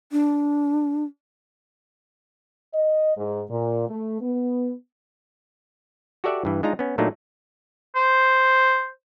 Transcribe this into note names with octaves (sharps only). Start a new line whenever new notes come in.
D4
D#5
G#2
A#2
A3
B3
F#4 G4 A4 D5 E5 F#5
G2 E3
G#3 D4 D#4 F4 A#5
B3 C#4
A#2 F#3 A3 A#3 D4 D#4
C5